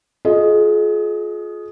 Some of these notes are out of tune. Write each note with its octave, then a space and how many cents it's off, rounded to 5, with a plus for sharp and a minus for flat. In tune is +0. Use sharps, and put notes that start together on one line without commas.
F4 +20 G#4 +35 D#5 +0